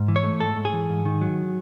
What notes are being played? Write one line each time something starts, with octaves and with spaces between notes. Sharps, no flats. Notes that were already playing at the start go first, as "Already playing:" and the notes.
Already playing: G#2
E3
C#5
A3
G#2 A4
G#2
G#4
E3
G#2
D#3
F#3